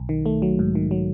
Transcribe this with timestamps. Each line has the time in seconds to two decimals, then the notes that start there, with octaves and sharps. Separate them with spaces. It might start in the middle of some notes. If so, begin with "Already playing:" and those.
Already playing: B1
0.09 D#3
0.26 A3
0.42 F#3
0.59 G#2
0.75 D#3
0.91 F#3